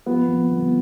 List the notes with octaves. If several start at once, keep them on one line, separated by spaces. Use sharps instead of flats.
F3 B3
F2
G1